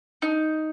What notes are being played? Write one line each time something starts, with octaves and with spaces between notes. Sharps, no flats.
D#4